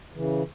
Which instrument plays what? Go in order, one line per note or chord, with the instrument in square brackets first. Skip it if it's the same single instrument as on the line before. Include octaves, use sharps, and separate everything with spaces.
[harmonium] C#3 E3